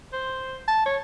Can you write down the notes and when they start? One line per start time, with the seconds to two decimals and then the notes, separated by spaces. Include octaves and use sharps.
0.13 C5
0.68 A5
0.86 C#5